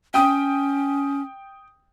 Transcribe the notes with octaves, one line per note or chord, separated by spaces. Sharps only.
C#4 G5 D#6